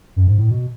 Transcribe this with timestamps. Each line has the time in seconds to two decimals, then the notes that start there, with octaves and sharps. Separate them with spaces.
0.16 F#2
0.27 G#2
0.38 A2
0.50 B2